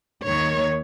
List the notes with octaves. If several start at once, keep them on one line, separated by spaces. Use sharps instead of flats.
D#2 D#3 C#5